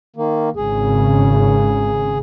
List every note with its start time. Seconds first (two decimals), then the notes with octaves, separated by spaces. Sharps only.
0.16 D#3 A#3
0.56 G#1 C#3 G#4